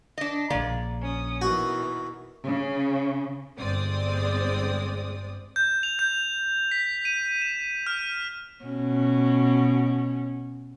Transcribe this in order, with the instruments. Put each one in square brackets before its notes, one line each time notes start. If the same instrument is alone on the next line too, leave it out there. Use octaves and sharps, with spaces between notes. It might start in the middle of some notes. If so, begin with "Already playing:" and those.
[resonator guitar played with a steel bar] D4 D#5
[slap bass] A#1 C#3 [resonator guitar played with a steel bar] A#3 D5
[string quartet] C#4 D#6
[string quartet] B2 D#3 E3 [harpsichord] F#4
[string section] C#3
G1 G#3 C4 D5 D#6
[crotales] G6
F7
G6
B6
D#7
E7
F6
[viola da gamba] B2 C#4